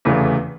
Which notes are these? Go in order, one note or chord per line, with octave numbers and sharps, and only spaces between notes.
F1 E2 C#3 E3 A3